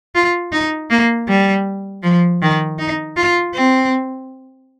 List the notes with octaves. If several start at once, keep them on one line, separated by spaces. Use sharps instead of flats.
F4
D#4
A#3
G3
F3
D#3
D#4
F4
C4